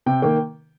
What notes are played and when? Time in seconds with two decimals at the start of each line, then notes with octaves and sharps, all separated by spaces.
0.06 C3 G5
0.22 D#3 A#3 G5